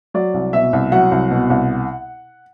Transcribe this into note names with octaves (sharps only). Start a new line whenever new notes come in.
F#3 D5
C2
B2 E5
C2
F#3 F#5
C2
B2
C2